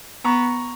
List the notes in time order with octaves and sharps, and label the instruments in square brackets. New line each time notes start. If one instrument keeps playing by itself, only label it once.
[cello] B3 [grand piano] A#5 C#6